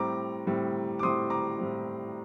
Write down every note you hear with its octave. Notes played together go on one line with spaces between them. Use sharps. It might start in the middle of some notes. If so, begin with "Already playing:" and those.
Already playing: A2 G3 C4 A#5 D6
A2 G3 C4
D6
A2 G3 C4 C6 D#6
A#5 D6
A2 G3 C4